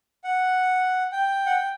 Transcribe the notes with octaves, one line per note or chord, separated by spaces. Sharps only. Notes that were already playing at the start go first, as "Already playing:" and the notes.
F#5
G5
F#5
G5